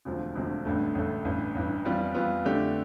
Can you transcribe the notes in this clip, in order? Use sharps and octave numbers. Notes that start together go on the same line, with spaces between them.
E1 D2 C3 F3
E1 D2 C3 F3
A1 G2 D3 A3
A1 G2 D3 A3
A1 G2 E3
A1 G2 E3
F2 E3 G3 B3 F4
F2 E3 G3 B3 F4
F2 D3 A3 D4 G4